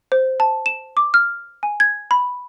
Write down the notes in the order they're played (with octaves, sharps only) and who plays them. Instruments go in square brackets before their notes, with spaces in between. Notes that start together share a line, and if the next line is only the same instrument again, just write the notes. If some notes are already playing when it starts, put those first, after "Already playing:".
[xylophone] C5
A5
E7
D6
F6
G#5
G#6
B5